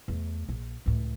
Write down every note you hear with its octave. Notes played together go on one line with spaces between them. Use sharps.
E2 A3
A#1
C#2 A2